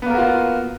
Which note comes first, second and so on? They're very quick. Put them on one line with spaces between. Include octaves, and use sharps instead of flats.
B3 A#3 A#4 F#4 F4